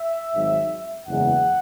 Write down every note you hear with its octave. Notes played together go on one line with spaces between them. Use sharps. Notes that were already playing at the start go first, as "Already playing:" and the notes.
Already playing: E5
G#1 G#2 F#3
F#1 E2 C#3 G#3 B3 F#5